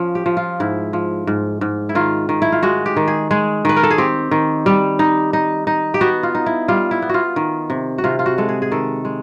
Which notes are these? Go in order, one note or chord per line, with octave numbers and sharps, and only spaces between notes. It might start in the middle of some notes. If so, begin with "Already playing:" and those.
Already playing: F3 C#4
G4
F3
F4
G#2 E4
F3
G#2
G#2
E4
D#3 F4
D#3
E4
F4
G#3 F#4
G4
D#3
G#4
G#3 G#4
D#3 B4
A#4
A4
G#4
C4 G4
D#3
G3
D#4
D#4
D#4
G4
B3 F#4
F4
D#4
E4
G3 F4
E4
B3
F4 F#4
D#3
C3
F#4
C3 F4
F4
F#4
G#3 A4
G#4
G#4
D#3 A4
G#3